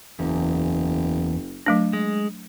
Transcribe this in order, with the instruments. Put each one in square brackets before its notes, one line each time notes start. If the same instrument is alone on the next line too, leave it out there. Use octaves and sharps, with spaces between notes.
[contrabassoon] F#1 [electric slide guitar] E2
[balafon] F#3 A3 D4
[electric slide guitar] G#3